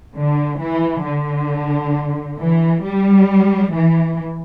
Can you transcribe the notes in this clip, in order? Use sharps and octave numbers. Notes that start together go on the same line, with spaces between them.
D3
E3
D3
E3
G3
E3